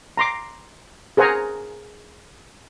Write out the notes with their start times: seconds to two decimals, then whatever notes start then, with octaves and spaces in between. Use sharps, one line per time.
0.17 A#5 C6 D6
1.17 G#4 A#4 C5 F#5 G#5 A#5